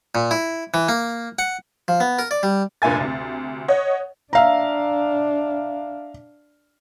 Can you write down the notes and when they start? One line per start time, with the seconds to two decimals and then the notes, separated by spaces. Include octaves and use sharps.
0.15 A#2
0.31 E4
0.74 E3
0.89 A#3
1.39 F#5
1.88 F3
2.00 B3
2.19 A#4
2.31 D5
2.43 G3
2.82 F1 G2 A#2 E5 G#5 A6
3.00 D2 C3
3.68 C#5 D#5 F#5
4.33 D4 E5 F5 A#5